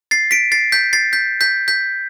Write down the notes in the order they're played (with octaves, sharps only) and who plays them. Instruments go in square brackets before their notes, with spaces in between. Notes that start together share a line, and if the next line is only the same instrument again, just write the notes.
[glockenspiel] A6 C7
B6 D7
A6 C7
G6 B6
A6 C7
G6 B6
G6 B6
G6 B6